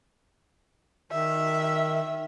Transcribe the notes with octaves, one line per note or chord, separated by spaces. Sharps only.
D#3 E5